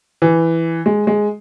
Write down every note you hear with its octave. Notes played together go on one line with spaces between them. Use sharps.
E3
G#3
G#3